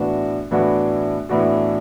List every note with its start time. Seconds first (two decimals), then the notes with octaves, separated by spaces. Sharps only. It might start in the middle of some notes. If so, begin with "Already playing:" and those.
Already playing: A2 E3 B3 D4 F#4
0.51 A2 E3 B3 D4 F#4
1.29 A2 E3 B3 D4 F#4